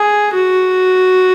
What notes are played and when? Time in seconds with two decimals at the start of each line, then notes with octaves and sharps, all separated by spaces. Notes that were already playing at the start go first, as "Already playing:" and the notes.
Already playing: G#4
0.33 F#4